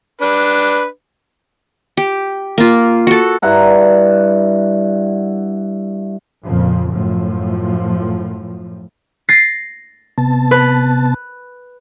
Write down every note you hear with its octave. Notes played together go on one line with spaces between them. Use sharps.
D4 B4
G4
A#3 F4
F#4 A4
G2 E4 F#5 A#5
F2 A#2 C#3 F3
F#2 A2 F3
A6 A#6 C7
C3 B3 A5
B4